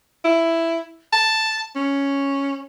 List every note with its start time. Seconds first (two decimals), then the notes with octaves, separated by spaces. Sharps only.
0.25 E4
1.13 A5
1.76 C#4